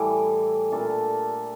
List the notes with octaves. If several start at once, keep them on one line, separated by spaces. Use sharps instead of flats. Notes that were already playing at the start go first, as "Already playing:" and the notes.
Already playing: A2 E3 G3
A#2 A3 D4 A4